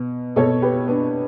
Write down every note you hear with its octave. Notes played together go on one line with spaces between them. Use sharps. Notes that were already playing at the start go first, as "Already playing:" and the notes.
Already playing: B2
B2 A4 C#5
G4 B4
B3 D4